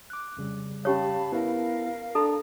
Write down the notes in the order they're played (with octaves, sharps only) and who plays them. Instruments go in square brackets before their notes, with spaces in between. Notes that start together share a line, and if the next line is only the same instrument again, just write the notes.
[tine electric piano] D6 F#6
F2 C#3 G3
[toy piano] C#4 G4 C#5 [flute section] F5 A5 B5
[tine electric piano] B3 E4 B4 [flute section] A#4 F5
[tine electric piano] D4 A5 A#5 [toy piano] A4